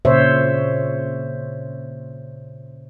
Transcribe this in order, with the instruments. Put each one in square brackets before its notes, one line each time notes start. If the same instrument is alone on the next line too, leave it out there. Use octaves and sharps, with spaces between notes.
[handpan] A#2 C#3 C5 C#5 E5